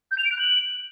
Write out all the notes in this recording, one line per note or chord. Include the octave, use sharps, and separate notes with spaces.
G6
F7
D7
F#6
F#7